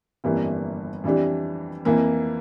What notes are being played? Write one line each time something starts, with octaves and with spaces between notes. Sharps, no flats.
G1 F2 E3 G3 A#3
F2 E3 G3 D4 G4
F2 E3 A#3